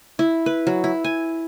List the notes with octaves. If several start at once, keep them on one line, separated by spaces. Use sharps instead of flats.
E4
B4
F#3
E4
G#5